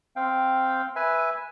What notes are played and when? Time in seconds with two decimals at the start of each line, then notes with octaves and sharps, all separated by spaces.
0.16 C4 F5 G5
0.96 B4 E5 G#5